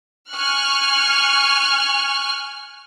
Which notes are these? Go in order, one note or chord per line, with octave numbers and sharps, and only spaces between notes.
G#5 C#6 F6 F#6